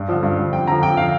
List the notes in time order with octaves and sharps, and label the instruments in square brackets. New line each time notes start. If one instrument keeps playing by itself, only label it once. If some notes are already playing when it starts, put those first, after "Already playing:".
Already playing: [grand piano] G2
D3 F3
G2
D3 F3
F2 G5
D3 F3 A#5
F2 G5
D3 F3 F5